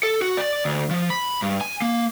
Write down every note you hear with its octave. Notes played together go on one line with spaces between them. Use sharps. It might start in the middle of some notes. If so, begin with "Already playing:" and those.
A4
F#4
D5
D2
F3
B5
G2
G#5
A#3